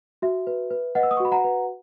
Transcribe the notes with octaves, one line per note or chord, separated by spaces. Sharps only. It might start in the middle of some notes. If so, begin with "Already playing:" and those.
F#4 E5
B4
B4
B4 D#5 F#5
E6
D#6
C#6
F#4 B5
F#5 A#5
B4